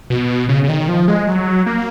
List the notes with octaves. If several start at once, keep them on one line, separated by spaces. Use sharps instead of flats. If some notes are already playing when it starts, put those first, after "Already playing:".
B2
C#3
C#3
D#3
F3
G#3
F#3
A#3